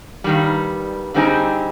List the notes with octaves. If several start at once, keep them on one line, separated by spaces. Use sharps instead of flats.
G2 D#3 G3
D3 G3 C4 D#4 G#4